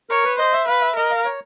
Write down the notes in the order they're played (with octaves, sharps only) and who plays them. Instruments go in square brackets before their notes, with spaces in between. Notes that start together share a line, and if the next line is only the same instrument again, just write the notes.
[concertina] A#4 [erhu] C#5
[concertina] B4
[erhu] C5 [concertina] D#5
[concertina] E5
[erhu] B4 [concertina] F5
[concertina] E5
[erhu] A#4 [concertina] D#5
[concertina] F5
C#5